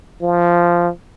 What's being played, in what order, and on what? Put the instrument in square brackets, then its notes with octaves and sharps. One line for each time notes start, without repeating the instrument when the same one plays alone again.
[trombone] F3